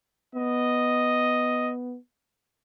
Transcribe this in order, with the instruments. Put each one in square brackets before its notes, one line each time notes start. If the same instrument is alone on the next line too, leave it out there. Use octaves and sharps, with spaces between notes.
[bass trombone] B3 [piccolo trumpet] D#5